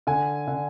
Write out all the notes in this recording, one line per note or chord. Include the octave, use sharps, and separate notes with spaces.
D3 G#5
D3